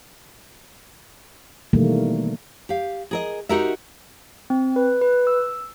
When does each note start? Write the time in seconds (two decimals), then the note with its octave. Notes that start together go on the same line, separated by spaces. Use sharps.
1.73 B2 D#3 E3 G3 A3 A#3
2.69 G4 F5
3.11 G#4 A#4 D#5
3.49 D#4 F#4 G4 A#4 D#5 E5
4.50 C4
4.76 B4
5.01 B4
5.27 E6